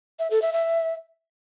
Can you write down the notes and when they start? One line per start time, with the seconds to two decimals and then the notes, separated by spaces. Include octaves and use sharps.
0.19 E5
0.31 A4
0.42 E5
0.53 E5